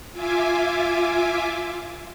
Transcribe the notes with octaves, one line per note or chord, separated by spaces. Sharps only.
F4 E5 G#5 D6